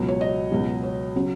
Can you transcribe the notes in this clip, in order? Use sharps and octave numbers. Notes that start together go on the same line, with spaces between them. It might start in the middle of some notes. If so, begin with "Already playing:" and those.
Already playing: C#2 B2 F#3
C#5
D#5
C#2 B2 F#3
C#5
C#3 F#3